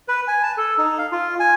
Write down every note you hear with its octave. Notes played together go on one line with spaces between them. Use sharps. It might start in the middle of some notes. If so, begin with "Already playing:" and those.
B4
G#5
A5
A4
D#4
F5
F4
G#5